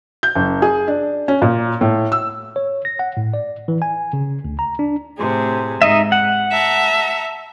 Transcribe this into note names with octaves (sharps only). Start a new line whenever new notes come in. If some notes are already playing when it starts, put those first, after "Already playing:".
G6
F#1
G#4
D4
C#4
A#2
A2
E6
C#5
A#6
F#5
A2
D5
E3
G#5
C#3
D2
A#5
D4
A2 C3 G#4
G#2 D#4 D#5 E5
F#5
E5 A5 A#5